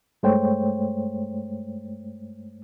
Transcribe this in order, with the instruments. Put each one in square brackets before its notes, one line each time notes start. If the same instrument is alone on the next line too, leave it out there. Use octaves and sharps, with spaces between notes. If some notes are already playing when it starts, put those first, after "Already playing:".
[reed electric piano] G2 G#3 A3 C5 C#5 G5